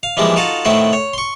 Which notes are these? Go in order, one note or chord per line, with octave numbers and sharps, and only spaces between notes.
F5
E3 F3 G3 G#3 A#3 E4
D#4 F4 F#4 A4 F5
A2 D#3 A3 C4 E4 F#4
C#5
C6 C#6